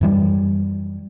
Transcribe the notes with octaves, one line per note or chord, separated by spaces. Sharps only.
F#2 E3 G3